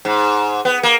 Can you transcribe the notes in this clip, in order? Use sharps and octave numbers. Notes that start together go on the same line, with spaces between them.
G#2
B3
A#3